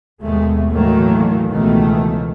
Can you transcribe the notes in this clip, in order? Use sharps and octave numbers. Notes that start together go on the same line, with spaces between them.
D#2 B2 G#3 A3
A2 D#3 E3 F#3 A3 A#3
C#2 B2 D#3 E3 A3